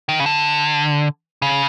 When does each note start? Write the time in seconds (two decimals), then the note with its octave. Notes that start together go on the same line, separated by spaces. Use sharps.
0.09 D#3
0.20 C#3
0.26 D3
1.42 C#3